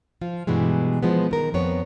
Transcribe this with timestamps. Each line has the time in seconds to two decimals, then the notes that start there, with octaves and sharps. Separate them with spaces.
0.21 F3 F4
0.47 G2 B2 E3 G3 G#3
1.03 F3 G#3 B3
1.31 D#3 A#4
1.54 F2 B3 C#5